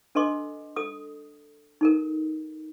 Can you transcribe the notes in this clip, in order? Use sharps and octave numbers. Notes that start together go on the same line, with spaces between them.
D4 A4 B4 D#5 C6 D6
A4 D#6
D#4 A4 A#4